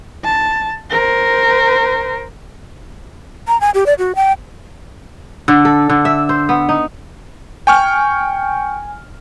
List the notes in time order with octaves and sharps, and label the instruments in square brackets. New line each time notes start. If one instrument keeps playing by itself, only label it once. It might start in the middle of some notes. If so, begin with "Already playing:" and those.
[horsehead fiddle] A5
A#4 C5
[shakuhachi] A#5
G#5
G4
D5
F#4
G5
[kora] D3
A4
D3
E5
C5
B3
D#4
[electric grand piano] G5 C#6 F6 [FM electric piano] G#5